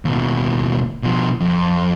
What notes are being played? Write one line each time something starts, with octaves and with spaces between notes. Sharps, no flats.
D#2 B2
B2 F3
F2